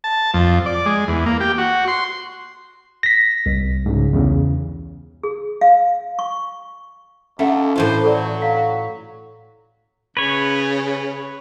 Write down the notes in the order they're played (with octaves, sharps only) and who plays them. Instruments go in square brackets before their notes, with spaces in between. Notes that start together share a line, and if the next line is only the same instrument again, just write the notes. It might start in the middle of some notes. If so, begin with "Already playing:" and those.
[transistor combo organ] A5
F2
D5
G#3
E2
A#3
G4
F#4
C6
[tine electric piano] A#6 B6
C2
[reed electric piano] G#2 C#3
E2 C#3
[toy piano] G#4
F5
C#6
[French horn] D#2 [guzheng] A3 [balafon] C#4 E5 F#5
[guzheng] A2 E3 F4 [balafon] E4 [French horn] C5
[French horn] F#3 [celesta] A4 D5
[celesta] F5 B6
[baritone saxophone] C#3 [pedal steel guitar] B4 C#5